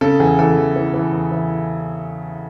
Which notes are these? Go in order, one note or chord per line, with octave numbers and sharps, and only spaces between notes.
C#3 A4
E2 G#4
E3 A4
E2
E3
E3
E2
E3